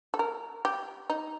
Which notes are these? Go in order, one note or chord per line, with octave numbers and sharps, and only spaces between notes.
A4
A#4
G4
D#4